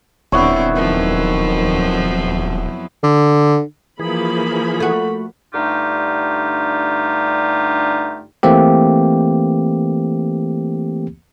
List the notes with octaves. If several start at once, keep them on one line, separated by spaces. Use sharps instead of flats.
D#1 D3 B3 C4 E4 C#5
F2 D#3 F3 F#3
D3
E3 F3 A#3 G#4 B5
A3 F#4
G2 D3 A3 D#4 F4 G4
E3 A3 A#3 C4 G4